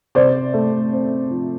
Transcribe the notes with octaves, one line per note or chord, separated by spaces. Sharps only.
C3 C5 D5
A3
C4
F3